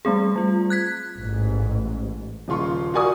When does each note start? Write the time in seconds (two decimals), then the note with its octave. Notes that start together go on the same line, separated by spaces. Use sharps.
0.05 G3 A3 C4 G#4
0.36 G3 F4
0.70 F#6 G#6 B6
1.15 A1 G#2
2.48 D#1 C#3 F4 C6 C#6
2.94 F#4 A#4 D5 G#5 C#6 D#6